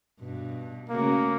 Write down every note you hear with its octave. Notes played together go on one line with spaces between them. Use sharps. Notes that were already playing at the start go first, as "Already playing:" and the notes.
G2 B2
C#3 A3 A#3 F#4